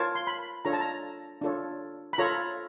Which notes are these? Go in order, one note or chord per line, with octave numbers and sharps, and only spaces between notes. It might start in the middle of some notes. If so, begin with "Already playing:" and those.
Already playing: F4 A#4 C#5 A5
C6
B5
D4 F4 A4 C#5 A#5
A5
A#5
D4 F4 A4 C#5
B5
F4 A4 C#5 A#5